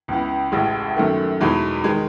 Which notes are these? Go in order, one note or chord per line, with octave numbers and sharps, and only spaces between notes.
C#2 C#3 E3 B3
A1 A2 G#3
F#2 D#3 A3
E2 B2 G#3 B3 D#4
D#3 G#3